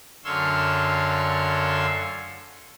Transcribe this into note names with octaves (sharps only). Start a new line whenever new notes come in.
F#2 D3 C#5 F5 C6 E6